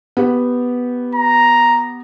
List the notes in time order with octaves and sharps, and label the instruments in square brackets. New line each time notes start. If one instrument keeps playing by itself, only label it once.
[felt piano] B3 G4 F#5
[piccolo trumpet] A#5